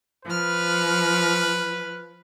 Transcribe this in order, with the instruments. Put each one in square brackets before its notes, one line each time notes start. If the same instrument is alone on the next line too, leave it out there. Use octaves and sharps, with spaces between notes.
[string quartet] F3 F6 [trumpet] B4